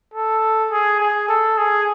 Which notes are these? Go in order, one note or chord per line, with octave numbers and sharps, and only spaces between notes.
A4
G#4
G#4
A4
G#4